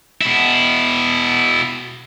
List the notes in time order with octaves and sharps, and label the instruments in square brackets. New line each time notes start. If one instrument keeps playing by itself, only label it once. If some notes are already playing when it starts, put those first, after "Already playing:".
[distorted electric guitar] B2 E4